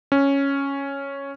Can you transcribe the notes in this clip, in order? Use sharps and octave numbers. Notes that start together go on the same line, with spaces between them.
C#4